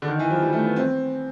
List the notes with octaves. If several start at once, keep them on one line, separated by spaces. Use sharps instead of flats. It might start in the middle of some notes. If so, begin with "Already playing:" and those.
D3
D#3
E3
F3
G3
A3
B3
C4